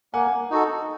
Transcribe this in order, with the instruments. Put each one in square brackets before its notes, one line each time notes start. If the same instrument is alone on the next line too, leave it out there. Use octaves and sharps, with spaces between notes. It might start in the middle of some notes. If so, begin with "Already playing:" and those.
[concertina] A#3 [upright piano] F#5 G#5
[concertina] D#4 F#4 A4